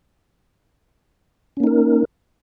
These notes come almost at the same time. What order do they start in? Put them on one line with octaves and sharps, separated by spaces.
C#4 A#3 D#4 A#4